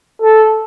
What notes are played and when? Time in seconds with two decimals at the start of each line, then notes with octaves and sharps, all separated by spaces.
0.22 A4